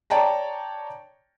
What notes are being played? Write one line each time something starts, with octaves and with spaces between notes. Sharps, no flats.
C#5 D5 G5 A5 A#5